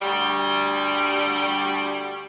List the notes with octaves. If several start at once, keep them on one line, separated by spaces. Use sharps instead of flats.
D2 G3